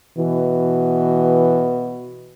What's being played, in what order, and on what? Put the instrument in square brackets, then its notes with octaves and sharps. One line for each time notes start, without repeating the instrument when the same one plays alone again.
[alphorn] B2 [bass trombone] E3